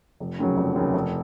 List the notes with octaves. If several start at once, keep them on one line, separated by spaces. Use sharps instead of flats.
F1
D#2 C#3 F#3
F1
D#2 C#3 F#3
F1